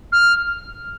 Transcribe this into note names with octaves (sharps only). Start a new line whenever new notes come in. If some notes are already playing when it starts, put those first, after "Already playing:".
F6